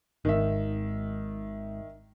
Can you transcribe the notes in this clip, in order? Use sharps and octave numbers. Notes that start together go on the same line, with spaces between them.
G#1 G#2 D#3 E5